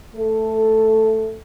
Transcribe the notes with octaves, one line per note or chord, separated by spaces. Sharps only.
A3 A4